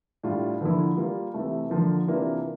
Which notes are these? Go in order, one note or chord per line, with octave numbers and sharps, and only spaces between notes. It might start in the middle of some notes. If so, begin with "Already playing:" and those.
A2 G3 D4 F4
D3 F3 A#3 E4
G3 A#3 F4
C3 E3 A3
D3 F3 A#3
C3 E3 A#3 D4 F4